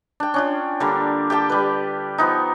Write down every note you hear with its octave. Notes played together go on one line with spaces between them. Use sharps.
D4 G5
C#4 D4 F4
D3 G3 A#3
G4 F5 G5 A5
G3 B4
F3 B3 D#4